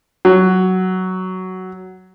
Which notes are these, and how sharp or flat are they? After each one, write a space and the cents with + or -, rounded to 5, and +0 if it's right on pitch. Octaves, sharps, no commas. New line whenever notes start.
F#3 +10